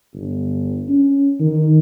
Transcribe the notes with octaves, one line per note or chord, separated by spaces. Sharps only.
G1
C#4
D#3